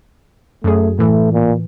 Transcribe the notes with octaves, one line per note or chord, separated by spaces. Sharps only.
F#2 A3 G#4
A2 E3 A3
A#2